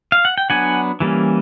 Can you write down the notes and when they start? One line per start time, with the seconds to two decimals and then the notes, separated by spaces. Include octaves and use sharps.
0.12 F5
0.25 F#5
0.38 G5
0.50 F#3 B3 D4 F#5 G#5
1.00 E3 G3 A#3 C#4